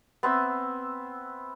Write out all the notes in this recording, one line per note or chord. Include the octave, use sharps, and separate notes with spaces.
B3 C4 E5 E6